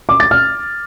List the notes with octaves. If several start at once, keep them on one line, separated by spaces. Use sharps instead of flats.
D6
A6
F6